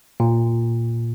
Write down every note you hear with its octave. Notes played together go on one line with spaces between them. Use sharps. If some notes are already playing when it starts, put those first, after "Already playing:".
A#2